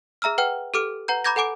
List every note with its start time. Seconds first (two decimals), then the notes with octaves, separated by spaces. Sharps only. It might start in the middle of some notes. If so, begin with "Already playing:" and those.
0.22 G#4 E5 A#5 E6 F6
0.38 B4 F#5 G5 F6
0.74 G4 A4 D6 F6 D7
1.08 B4 F#5 A#5 G6
1.24 A#5 B5 D6 G6 G#6 A#6
1.36 A4 F#5 G#5 D6 D7